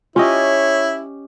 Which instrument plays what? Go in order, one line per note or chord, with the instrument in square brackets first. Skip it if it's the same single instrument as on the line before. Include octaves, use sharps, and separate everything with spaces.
[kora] C#4 G4 D#5 [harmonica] E4 [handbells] F4 [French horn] C#5